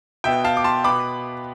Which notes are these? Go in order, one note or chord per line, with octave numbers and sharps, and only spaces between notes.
B2 B3 E5 G5
F5 A5
D6
A5 C6
B2 B3 B5 D6